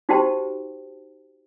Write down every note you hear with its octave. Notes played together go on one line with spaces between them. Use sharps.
D#4 F#4 G4 C5 G5 A5